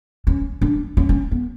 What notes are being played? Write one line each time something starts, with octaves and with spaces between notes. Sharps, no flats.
C#4
D4
C#4
C#4
B3